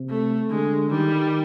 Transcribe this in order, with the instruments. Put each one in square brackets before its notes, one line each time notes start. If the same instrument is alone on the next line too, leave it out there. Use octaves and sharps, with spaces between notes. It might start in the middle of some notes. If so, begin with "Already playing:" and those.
Already playing: [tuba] C3
[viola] A3
[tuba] D3 [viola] G#3
[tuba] D#3 [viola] G3